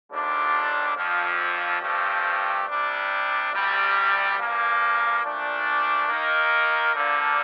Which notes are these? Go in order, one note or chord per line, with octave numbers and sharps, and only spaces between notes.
D#2 D3 G3 D4 F4
F2 D3 F3
G2 F3 A3 C4 G4
C3 G3 D4
D2 C3 G3
G2 F3 A#3
A#2 F3 A3 D4
D#3 A#3 D#4 A#4
D3 F3 A#3 D4